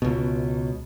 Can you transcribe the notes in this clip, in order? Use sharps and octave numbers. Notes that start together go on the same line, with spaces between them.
C#2 B2